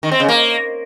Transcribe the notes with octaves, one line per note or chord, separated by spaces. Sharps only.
D#3
C4
C#3
A#3